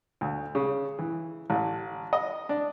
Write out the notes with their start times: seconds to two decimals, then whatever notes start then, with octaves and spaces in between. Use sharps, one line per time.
0.21 D2
0.55 C#3
0.99 E3
1.50 A1
2.13 D#5
2.49 D4